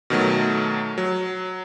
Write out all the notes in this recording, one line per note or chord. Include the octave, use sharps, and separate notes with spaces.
B2 D#3 F#3 A3
F#3